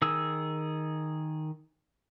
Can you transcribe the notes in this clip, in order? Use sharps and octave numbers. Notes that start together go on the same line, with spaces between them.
D#3 G#4 E6